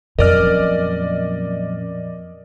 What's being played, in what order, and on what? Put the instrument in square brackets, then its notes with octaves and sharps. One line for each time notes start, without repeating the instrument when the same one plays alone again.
[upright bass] F2 [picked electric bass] A#2 F#3 C#4 [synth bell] A#4 F6 [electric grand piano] D5 D#5